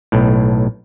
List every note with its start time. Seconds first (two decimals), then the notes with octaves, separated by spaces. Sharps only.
0.12 B1 A2